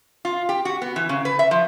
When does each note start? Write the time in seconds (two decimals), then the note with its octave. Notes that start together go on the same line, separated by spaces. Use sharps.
0.25 F4
0.49 G4
0.65 F#4
0.82 B3
0.96 E3
1.09 C#3
1.25 B4
1.39 E5
1.51 F3